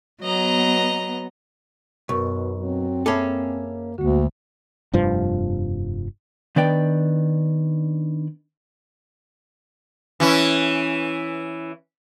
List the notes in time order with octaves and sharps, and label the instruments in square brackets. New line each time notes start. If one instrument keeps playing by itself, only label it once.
[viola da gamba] F#3 [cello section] B3 [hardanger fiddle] D#5 A#5
[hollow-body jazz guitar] B1 [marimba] F#2 A#4 C#6 [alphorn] B2
[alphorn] F#3 [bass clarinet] C4
[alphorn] A#3 [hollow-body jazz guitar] C#4 G#4 A4 [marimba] E5 B5 D6
[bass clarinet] D2 [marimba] D3 G#3 A#3 [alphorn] F#4
[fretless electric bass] F1 G2 F3
[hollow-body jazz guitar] D#3 B3 D4 B4 D5 G5
[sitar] E3 C#4 E4